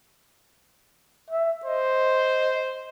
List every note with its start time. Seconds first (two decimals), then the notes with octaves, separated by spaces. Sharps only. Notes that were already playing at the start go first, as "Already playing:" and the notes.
1.31 E5
1.65 C5 D#5